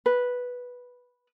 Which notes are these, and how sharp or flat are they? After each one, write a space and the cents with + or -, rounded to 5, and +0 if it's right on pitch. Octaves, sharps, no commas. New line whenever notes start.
B4 -5